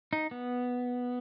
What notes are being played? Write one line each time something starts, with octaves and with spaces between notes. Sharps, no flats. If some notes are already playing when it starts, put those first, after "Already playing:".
D#4
B3